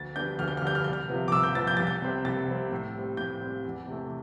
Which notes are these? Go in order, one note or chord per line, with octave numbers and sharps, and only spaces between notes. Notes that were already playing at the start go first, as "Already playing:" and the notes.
Already playing: D2 A6
D3 G3 B3 D4 G6
D2 F6
G6
F6
D3 G3 B3 D4 G6
F6
C2 G6
F6
C3 F3 B3
D6
C2 E6
G6
C3 F3 B3 A6
G6
C2 A6
G6
C3 G3 C4
C2 A6
C3 G3 C4
A2
G3 C4
A2 G6
G3 C4
E2
C3 E3 A3